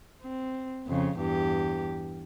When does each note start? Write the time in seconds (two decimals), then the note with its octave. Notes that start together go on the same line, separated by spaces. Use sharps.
0.22 C4
0.87 F2 C#3
1.18 E2 G2 G4